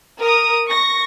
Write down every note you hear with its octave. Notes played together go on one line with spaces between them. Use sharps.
A#4 D#6
C#6 A#6